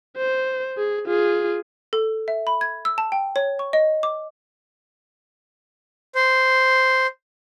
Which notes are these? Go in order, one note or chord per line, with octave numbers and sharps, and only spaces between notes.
C5
G#4
F4 G#4
A4
E5
B5
G#6
E6
A5
G5
C#5
C#6
D#5
D6
C5